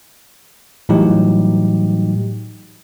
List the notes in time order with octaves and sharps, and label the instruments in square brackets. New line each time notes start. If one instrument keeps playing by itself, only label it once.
[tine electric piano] A2 E3 F#3 G3 D#4 G4